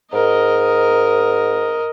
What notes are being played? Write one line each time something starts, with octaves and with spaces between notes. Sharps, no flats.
G#2 A#4 D#5